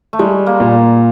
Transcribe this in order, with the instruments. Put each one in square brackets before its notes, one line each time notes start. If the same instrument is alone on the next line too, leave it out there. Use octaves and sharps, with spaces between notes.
[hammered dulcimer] A3
[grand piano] G3 [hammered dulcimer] G#3
[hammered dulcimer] A#3
[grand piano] A#2